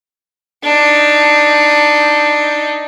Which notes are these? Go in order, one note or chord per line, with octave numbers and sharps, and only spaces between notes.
D4 D#4